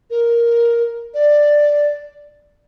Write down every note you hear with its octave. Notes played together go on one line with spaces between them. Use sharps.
A#4
D5